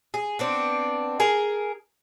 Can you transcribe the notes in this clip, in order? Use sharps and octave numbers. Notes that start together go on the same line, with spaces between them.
G#4
B3 C4 D4
G#4 A#4